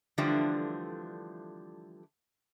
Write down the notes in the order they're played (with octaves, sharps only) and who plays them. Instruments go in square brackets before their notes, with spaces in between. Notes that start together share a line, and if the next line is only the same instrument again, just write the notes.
[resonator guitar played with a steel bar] D3 E3 F3 G3 A3 D4